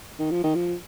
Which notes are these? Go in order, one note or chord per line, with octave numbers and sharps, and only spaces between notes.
D#3
F3
D#3
F3